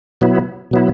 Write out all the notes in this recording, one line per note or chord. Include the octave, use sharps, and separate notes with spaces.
B2 F#3 B3 E4
B2 F#3 B3 E4